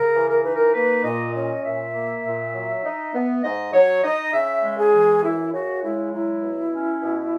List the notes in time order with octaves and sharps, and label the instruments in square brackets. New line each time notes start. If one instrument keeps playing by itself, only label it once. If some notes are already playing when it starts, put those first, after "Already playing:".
Already playing: [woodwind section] C#3 A#4
E3
A#4
D#4 B4
A#4
A#3 B4
A#2 D#5
C#4 D#5
A#2 E5
A#3
A#2
F#3
D#4
B3
G#2 D#5
F#3 C#5
D#4 D#5
C#3 E5
G#3
G#4
E3
F#2 E4
C#3 F#4
G#3 E4
F#3 E4
B2
C#4
B2